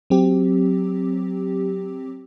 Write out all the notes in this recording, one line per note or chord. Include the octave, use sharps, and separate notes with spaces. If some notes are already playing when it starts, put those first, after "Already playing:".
F#3 C4 G4